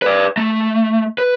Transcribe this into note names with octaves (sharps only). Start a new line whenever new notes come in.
B4 D5
A3
B4